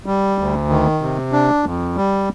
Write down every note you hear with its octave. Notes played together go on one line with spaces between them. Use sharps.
G3
D2
D#3
C3
D4
F2
G3